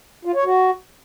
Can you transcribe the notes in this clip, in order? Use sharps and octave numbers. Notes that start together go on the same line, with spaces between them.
F4
C#5
F#4